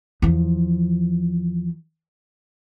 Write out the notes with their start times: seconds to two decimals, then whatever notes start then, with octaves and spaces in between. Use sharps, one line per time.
0.22 E2 F3